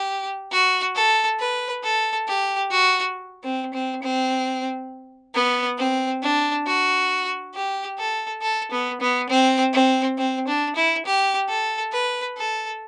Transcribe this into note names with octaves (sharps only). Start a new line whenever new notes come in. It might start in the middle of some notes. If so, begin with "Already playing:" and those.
Already playing: G4
F#4
A4
B4
A4
G4
F#4
C4
C4
C4
B3
C4
D4
F#4
G4
A4
A4
B3
B3
C4
C4
C4
D4
E4
G4
A4
B4
A4